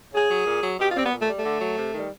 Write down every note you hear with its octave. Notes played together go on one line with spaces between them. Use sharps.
C#3 G#4
F#3
A#2
F#3
B2 G4
F4
G3 C4
B3
A#2
A3
G3
A3
D3
F#3
C3
D#3 G3